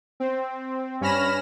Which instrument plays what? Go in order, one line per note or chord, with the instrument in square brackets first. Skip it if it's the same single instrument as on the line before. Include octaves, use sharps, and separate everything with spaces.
[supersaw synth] C4
G2 C#4 B5 F6 A#6 E7